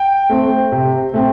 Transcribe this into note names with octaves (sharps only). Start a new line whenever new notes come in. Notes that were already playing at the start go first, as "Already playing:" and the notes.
Already playing: G5
A3 C4
C3
A3 C4